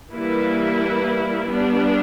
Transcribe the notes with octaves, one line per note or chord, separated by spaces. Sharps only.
E3 G3 A#3 E4 B4
G3 B3 D4